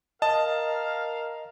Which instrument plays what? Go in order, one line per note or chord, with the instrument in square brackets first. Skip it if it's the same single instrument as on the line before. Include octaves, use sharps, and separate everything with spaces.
[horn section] A#4 F5 [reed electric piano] D#5 [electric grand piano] A5